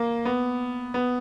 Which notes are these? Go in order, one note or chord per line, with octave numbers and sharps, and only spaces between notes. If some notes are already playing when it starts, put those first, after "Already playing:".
Already playing: A#3
B3
B3